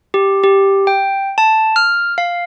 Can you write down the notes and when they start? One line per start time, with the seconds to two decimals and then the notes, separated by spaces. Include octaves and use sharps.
0.14 G4
0.43 G4
0.87 G5
1.38 A5
1.76 F6
2.18 F5